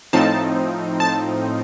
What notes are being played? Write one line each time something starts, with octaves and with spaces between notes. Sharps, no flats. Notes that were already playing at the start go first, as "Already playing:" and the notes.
A2 F3 C4 D#4 A5
A5